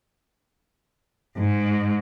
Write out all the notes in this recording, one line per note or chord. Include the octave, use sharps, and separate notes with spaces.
G#2